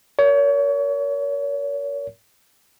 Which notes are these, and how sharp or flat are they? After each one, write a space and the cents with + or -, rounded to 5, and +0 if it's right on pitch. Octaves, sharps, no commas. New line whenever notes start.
A#4 +0 C#5 +35